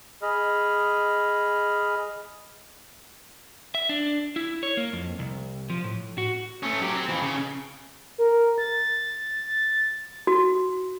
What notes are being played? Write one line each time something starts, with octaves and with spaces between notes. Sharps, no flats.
G#4 D#5 B5 F6
E5
D4
E4
C#5
A#3
F2
C2
F3
A2
F#4
A3 C#4
F#3 G4
C4
F2 E3
C#3
A#4
A6
F#4